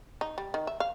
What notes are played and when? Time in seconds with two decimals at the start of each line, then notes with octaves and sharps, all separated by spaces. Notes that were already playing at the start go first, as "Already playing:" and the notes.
0.21 D#4
0.38 G3
0.54 D#3
0.67 E5
0.80 F5